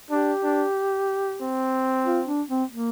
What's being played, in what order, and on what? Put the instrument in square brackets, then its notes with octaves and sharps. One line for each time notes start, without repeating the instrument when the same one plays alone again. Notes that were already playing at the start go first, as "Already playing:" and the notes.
[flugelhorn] D4 [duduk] G4
[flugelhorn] D4
C4
[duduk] F4
D4
C4
A#3